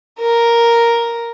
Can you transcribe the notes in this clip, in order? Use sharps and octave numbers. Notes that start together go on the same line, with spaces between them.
A#4